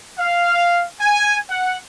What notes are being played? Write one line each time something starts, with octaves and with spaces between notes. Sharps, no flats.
F5
G#5
F#5